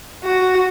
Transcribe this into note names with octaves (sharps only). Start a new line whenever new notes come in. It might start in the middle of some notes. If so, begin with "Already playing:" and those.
F#4